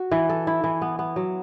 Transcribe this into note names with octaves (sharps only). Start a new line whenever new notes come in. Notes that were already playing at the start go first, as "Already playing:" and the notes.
Already playing: F#4
E3
A4
E4
E3
B3
B3
F#3